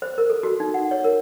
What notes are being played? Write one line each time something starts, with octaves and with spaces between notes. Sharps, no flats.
C5
A#4
A4
F#4
D#4
F#5
C#5
A#4